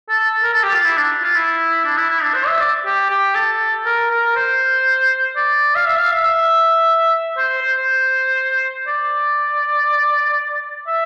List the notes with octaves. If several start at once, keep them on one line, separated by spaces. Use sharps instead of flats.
A4
A#4
A4
G4
F4
E4
D4
F4
E4
D4
E4
E4
D4
C5
E5
D5
G4
G4
A4
A#4
A#4
C5
D5
F5
E5
F5
E5
E5
C5
C5
D5
E5